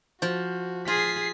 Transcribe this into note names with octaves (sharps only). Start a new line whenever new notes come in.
F3 F#4
F4 G#4 B6 C7